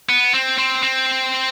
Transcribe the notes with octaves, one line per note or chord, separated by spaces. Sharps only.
B3
C4
C4
C4